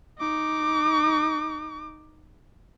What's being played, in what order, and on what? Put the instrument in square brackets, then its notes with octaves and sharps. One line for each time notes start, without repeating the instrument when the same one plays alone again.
[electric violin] D#4 D6